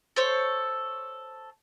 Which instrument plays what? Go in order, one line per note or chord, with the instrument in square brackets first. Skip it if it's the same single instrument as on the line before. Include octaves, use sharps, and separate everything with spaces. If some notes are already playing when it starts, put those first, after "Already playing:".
[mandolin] A4 C5 C#5